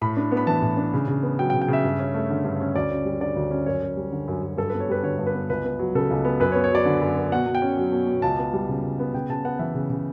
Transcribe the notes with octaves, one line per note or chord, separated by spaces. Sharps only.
A2 B5
D4
B3
B5
E3 A5
A2
D4
C#3
C#3
B3
F#3 G5
G5
C#3
G5
C#3 E5
G2
C#4
A3
D3
G2
C#4
D2 D5
C#4
G3
D3 D5
D2
C#4
F#2 C#5
F#2
G3
D3
F#2
F#2
G2 A4
B3 B4
C#5
G3 B4
D3 C#5
G2
B4
B3
C#2 B4
B3
F#3
C#3 A4
C#2
B3
F#2 B4
C#5
B3
C#5
F#3 D5
D3
F#2
B3
B2 F#5
B2
G5
C#4
F#3
B2
B2
C#2 A5
B3
G3
C#3
C#2
B3
C#3 G5
C#3 A5
B3 F#5
E3 E5
C#3
C#3